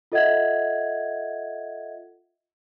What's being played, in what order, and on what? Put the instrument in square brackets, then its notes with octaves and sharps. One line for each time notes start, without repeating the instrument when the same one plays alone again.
[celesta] F4 A4 D#5 E5 F#5 G#6